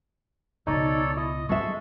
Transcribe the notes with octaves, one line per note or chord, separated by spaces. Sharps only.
C#2 B2 D#4 A4 C#5 D5
E4 D#5
G#3 B3 A4 E5 C#6